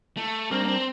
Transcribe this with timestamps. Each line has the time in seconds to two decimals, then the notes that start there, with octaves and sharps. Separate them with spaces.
0.17 A3
0.51 G3 C4 D4 G4 A#4
0.64 A#3
0.68 C4